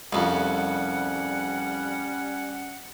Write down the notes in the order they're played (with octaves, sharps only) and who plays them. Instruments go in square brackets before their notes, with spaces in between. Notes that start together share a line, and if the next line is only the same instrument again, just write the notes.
[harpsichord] C2 F2 [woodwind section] G3 C#4 F#5